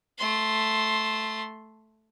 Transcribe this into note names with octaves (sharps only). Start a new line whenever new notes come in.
A3 C6